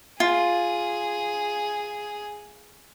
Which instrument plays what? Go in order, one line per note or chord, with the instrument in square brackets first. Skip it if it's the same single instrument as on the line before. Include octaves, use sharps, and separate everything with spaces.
[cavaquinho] F4 [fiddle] G#4